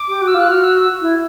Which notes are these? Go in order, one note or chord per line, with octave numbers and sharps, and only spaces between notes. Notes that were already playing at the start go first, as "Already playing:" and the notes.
Already playing: D6
G4
F#4
E6
F4
F#6
F#4 F6
E6
E6
E4